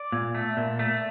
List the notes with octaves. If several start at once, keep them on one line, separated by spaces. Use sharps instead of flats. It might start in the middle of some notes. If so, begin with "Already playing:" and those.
Already playing: D5
A#2
A3
A#2
A3